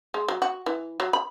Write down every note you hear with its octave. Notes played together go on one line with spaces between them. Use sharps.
G#3
F#3
F#4
E3
F#3
B5